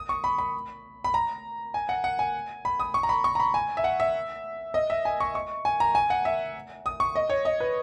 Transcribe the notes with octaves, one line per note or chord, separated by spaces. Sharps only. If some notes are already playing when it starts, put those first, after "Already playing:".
Already playing: D#6
C#6
B5
B5
B5
A#5
G#5
F#5
F#5
G#5
B5
D#6
C#6
A#5
B5
C#6
A#5
B5
G#5
E5
F#5
E5
D#5
E5
G#5
C#6
C#6
G#5
A#5
G#5
F#5
E5
D#6
C#6
D#5
C#5
D#5
B4